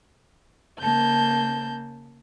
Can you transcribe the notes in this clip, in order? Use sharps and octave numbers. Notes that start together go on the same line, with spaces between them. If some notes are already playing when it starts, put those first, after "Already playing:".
C#3 A#3 A5 G6